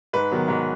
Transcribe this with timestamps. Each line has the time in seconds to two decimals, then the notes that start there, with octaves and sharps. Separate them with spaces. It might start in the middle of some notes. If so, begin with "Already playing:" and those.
0.13 G#2 B4
0.31 D#3 F#3 B3
0.48 G#2